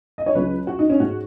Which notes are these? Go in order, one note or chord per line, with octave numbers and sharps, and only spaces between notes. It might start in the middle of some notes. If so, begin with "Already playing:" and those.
D#5
C#5
C#2 C#3 F#3 B4
F#4
D#4
C#4
G#2 G#3 F#4